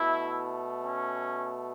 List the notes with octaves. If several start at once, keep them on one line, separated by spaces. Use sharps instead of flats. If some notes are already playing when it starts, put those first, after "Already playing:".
Already playing: B2 A3 E4
C#4